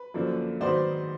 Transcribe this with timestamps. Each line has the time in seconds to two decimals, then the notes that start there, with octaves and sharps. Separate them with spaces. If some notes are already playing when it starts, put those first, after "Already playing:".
Already playing: B4
0.14 F#2 D3 F3 A#3 D4
0.61 G#2 D#3 F#3 B3 D#4 C5 D5